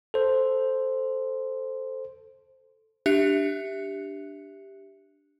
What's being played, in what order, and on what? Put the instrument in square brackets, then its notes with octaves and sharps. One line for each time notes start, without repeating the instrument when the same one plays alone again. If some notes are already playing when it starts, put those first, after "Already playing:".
[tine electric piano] A4 C5
[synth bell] D4 G4 E5 F#6 C#7